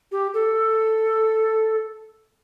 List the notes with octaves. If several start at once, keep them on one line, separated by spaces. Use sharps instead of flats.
G4
A4